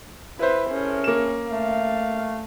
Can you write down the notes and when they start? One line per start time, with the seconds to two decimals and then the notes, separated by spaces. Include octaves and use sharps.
0.39 E4 B4 C5
0.70 A3 C#4 G#4 A#4
1.04 A#3 E7
1.50 A3 F5